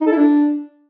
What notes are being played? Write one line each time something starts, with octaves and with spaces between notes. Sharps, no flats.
D#4
A4
E4
D4